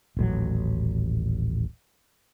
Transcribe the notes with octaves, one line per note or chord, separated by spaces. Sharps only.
D#1 A1 F#3